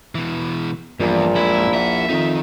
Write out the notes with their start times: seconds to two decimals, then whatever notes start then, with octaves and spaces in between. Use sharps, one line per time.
0.15 B2 E3
1.00 A#1 E2 G2 A#2
1.35 F#2 G#3 E4
1.74 E4 E5 F#5
2.09 F2 D#3 D#4